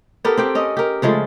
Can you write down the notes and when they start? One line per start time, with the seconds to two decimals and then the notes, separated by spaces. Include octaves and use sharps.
0.24 B3 G4 A4 A#4
0.37 C4 G4 G5
0.55 C#4 D#5
0.77 G4 A#4
1.02 C#3 F3 G#3 A3